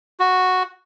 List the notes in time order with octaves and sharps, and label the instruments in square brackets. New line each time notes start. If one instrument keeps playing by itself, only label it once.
[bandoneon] F#4